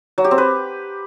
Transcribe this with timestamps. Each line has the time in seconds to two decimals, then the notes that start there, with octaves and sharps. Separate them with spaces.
0.18 F#3
0.24 G4
0.31 C4
0.38 B4